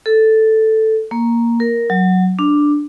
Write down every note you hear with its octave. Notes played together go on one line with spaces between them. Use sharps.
A4
A#3
A#4
F#3
D4